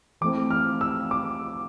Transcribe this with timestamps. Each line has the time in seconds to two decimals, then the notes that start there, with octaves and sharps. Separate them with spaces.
0.21 E3 A3 C4 D6
0.51 F6
0.81 E6
1.11 D6